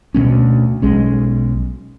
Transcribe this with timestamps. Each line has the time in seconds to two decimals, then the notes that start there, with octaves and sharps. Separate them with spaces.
0.14 D2 B2 A3 C#4
0.82 B1 G#3 C#4